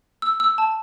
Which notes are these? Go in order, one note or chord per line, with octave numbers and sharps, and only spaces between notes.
E6
E6
A5